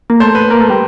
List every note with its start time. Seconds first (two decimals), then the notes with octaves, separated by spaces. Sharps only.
0.10 A#3
0.20 A3 C5
0.35 B4
0.50 A#3 A#4
0.61 A3
0.70 G3